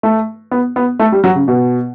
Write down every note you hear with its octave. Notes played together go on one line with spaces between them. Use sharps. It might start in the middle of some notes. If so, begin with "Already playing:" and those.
A3
B3
B3
A3
G3
F#3
C#3
B2